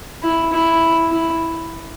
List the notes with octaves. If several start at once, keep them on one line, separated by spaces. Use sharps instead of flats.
E4
E4
E4